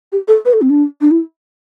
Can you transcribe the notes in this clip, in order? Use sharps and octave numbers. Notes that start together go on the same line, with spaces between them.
G4
A4
B4
A4
C4
D4
D4
E4